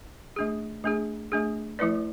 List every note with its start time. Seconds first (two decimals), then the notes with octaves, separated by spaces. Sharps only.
0.36 A3 D4 G#4
0.84 A3 D4 G#4
1.32 A3 D4 G#4
1.79 F3 A3 E4 B4 D5